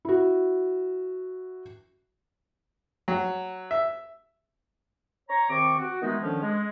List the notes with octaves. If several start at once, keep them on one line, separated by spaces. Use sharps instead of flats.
E4 F#4
F#3
E5
C#5 A#5
C3 D#3 C4 C#6 D6
F#4
D#3 E3 G#3 A3 B3 D#4
D3 D#3 F3 C#4
G#3